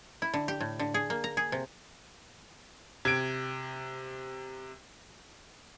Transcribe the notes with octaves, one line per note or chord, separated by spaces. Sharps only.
E4
D3
G4
A2
D3
G#4
A#3
A#5
G#4
C3
C3 G#6 D7